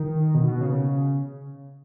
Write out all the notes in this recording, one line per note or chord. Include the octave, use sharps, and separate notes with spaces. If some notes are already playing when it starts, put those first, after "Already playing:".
Already playing: D#3
B2
B2
C#3